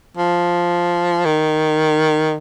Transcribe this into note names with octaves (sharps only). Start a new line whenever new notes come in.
F3
D#3